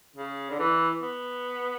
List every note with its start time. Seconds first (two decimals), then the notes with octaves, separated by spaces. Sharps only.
0.16 C#3
0.50 D3
0.59 E3
1.02 B3